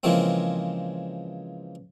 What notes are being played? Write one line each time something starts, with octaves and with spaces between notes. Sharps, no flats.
C#3 E3 F3 G#3 A#3 C4